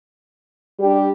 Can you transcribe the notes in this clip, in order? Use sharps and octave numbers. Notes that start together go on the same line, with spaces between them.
G3 D4 G4